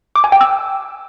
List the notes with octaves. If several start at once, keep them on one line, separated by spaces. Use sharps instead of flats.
D6
G#5
G5
E6